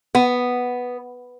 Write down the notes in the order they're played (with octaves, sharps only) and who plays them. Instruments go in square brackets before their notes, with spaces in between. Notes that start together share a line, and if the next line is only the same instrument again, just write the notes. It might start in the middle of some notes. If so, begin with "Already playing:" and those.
[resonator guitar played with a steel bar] B3